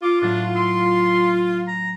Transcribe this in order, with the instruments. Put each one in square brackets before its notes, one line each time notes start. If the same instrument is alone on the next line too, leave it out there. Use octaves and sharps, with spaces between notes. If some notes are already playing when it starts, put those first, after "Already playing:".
[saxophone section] F4 [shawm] D6
[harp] A2 F#3 B3 [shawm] D4
[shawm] C6 [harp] E6 C7 D7
[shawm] A#5